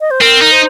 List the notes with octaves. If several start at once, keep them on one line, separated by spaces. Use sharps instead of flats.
D#5
C5
C4 A#4
D#4
C5